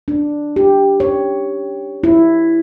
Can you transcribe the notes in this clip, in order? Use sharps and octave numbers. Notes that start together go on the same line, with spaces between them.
D4
G4
C#5
E4